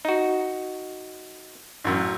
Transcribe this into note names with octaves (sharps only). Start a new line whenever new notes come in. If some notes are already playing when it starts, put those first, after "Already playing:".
D#4 F#4
A1 F#2